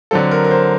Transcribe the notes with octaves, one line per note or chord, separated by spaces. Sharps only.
D3 F#3 C4 A4
A#4
A#4
C5